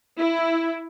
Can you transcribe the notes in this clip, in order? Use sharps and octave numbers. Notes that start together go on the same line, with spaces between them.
E4